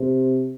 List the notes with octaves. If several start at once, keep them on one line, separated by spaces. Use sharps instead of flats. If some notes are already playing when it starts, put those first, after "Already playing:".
Already playing: C3